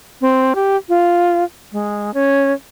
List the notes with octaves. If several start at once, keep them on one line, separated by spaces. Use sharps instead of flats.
C4
G4
F4
G#3
C#4